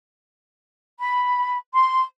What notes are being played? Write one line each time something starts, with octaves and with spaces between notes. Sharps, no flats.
B5
C6